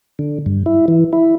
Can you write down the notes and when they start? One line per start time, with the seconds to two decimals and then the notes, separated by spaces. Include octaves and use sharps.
0.19 D3
0.46 G2
0.66 E4
0.88 E3
1.13 E4